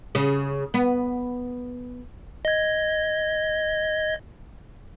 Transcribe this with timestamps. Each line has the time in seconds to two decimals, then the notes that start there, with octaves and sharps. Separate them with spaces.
0.15 C#3
0.74 B3
2.45 D#5 G#6